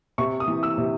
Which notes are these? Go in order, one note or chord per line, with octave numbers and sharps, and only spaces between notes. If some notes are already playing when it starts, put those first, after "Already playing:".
C3 C#6
D#6
E3
E6
C3